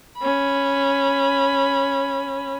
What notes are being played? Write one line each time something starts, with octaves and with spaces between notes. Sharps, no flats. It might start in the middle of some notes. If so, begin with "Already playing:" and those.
C#4 B5